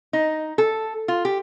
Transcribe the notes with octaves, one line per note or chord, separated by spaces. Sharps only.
D#4
A4
F4
G4